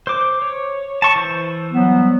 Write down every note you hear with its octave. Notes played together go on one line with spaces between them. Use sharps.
C5 D6
C#5
A5 C#6
E3 C5
F#3 G3 B3